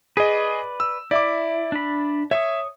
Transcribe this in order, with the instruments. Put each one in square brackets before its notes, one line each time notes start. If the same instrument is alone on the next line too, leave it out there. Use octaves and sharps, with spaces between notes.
[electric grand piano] G#4 D#5 [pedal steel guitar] B4 D5
[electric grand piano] E6
[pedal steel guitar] E4 [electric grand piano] D5 E5 D6
[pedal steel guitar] D4 B5
[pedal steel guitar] C#5 C#6 D#6 [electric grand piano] E5